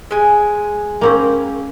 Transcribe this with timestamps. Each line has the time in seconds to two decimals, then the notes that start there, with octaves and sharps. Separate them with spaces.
0.11 G#3 G#5
1.01 A#3 C4 C#4